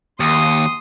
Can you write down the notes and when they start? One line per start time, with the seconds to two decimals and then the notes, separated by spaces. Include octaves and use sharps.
0.20 D#2 C6 D#6